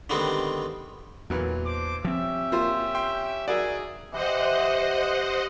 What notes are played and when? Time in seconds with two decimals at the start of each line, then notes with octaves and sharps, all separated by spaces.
0.10 D3 D#3 G3 G#3 B3 C4
1.30 E2 A#2 E3 F#3
1.65 D4 C5 D6
2.05 F3 C4 C#4 G4 E5
2.51 A#3 F4 C5
2.95 G5 C6
3.48 D#4 F#4 G#4 A#4 D5 E5
4.12 E3 E4 G4 C5 D#5 F#5